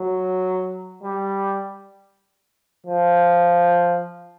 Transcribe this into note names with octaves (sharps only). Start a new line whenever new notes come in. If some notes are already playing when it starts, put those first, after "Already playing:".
Already playing: F#3
G3
F3